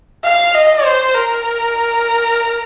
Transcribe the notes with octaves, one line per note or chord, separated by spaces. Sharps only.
F5
D#5
C5
A#4